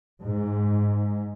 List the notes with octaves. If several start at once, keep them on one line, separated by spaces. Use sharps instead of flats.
G#2